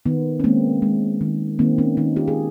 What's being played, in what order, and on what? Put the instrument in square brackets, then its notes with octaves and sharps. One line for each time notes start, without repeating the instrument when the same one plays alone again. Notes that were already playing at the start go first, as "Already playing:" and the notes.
[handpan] D#3 B3
C#4
G#3 A#3 C4
G#3
D#3
D#3 A#3 C4
B3 C#4
D#3 C#4 D#4
F4 G4
G#4